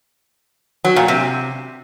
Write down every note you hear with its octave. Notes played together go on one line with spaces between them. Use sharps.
F#3
A#2
C3